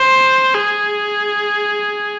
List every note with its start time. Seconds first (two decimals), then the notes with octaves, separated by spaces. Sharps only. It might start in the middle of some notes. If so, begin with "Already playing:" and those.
Already playing: C5
0.56 G#4